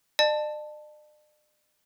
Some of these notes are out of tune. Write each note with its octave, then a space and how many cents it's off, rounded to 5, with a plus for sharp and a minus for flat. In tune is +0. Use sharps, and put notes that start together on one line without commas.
D5 +45 A5 +0